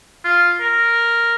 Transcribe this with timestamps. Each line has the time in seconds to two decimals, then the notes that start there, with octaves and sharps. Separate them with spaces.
0.24 F4
0.60 A#4